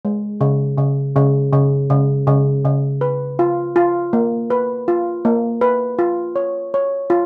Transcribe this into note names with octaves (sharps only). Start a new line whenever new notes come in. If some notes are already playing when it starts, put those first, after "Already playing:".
G#3
C#3
C#3
C#3
C#3
C#3
C#3
C#3
B4
F4
F4
A#3
B4
F4
A#3
B4
F4
C#5
C#5
F4